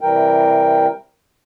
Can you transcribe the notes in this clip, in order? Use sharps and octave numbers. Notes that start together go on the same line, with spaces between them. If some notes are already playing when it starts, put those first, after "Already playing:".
C3 E3 G3 A#4 G5